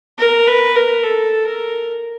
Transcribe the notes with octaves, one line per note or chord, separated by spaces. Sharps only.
A#4
B4
A#4
A4
A#4